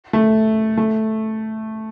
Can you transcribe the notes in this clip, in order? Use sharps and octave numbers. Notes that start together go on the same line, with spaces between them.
A3
A3